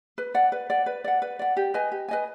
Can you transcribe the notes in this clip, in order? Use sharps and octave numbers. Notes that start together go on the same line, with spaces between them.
B4
D5 F#5
B4
D5 F#5
B4
D5 F#5
B4
D5 F#5
G4
B4 D#5 G#5
G4
B4 D#5 G#5